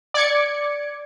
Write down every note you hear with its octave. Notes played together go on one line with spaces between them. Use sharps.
D5 D6 G#6 C#7